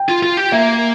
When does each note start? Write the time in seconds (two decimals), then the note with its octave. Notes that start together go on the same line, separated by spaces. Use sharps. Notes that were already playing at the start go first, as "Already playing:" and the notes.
Already playing: G5
0.09 F4
0.23 F4
0.37 G4
0.52 A#3 E5